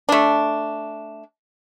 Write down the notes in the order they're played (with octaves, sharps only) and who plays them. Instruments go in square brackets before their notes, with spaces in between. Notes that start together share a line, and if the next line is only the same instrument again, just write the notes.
[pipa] A3 D4